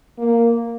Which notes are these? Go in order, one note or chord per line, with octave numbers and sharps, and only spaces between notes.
A#3